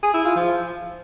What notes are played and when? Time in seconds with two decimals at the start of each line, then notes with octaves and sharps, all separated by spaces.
0.03 G#4
0.14 E4
0.25 F4
0.35 F3